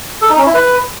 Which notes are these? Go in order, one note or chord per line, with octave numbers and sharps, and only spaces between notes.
A4
D#4
C#4
E4
B4